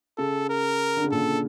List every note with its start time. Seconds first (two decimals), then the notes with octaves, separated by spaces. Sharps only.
0.17 C#3 A4
0.49 A#4
0.96 D3
1.04 C#3
1.11 A#2 A4